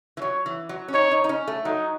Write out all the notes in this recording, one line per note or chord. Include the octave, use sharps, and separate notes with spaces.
E3
F#3 C#5
E3
F#3
C#4
D#4 C#5
D#4
D#4
C#4
A3
F#3 D#4